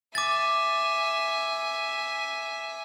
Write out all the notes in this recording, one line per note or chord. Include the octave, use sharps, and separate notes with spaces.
E5 G#5 D6 A6